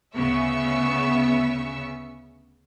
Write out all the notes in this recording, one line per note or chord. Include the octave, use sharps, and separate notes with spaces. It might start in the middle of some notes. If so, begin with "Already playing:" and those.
D2 C#3 B3 E5 C#6 E6